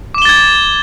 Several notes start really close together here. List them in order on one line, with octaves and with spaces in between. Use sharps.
D6 E7 G7 A6 G#6